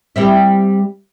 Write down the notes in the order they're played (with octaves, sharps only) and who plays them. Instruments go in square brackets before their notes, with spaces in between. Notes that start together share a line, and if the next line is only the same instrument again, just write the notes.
[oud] G3 C4 E4